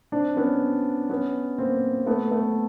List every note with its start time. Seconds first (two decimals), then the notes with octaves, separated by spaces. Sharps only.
0.12 C4 D4
0.36 B3 C#4
1.09 B3 C#4
1.58 A#3 C4
2.06 A3 B3
2.31 A3 B3